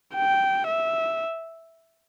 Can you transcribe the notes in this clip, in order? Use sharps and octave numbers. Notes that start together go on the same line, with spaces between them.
G5
E5